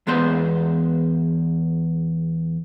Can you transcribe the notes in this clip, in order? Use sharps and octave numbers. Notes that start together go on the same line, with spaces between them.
E2 G#3 B3 C5